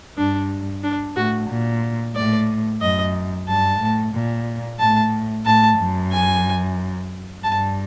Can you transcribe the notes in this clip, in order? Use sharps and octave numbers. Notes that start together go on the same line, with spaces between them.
G2 D4
D4
A2 F#4
A#2
A2 D5
F#2 D#5
G2 A5
A2
A#2
A2 A5
A2 A5
F#2
G#5
G2 A5